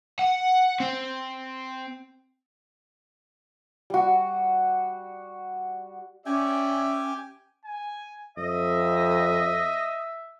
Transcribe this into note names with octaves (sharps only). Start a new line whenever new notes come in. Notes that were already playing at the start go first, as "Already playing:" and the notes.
F#5
C4
G3 F#4
C#4 G4 D5 E5 G5 G#5
G#5
F2 D#5 E5